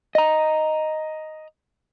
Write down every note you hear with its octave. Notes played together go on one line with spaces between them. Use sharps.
D#5 A#5